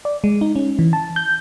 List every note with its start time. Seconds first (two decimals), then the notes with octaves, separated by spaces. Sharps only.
0.05 D5
0.24 G#3
0.41 D#4
0.56 C#4
0.79 E3
0.93 A5
1.16 G6